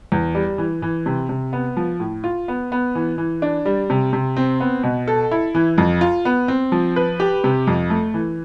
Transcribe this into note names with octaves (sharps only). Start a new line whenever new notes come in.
E2
G3
E3
E3
C3
C3
B3
F3
A2
F4
B3
B3
E3
E3
D4
G3
C3
C3
C4
B3
B2
A4
E4
E3
F2
F4
B3
C4
F3
B4
G4
C3
F2
A3
E3